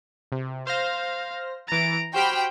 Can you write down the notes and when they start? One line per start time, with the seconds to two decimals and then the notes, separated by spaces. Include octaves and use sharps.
0.32 C3
0.67 C5 F5 F6 A#6
1.68 E3 A#5 A6 D7
2.14 F#4 G4 C5 G5 B5 F6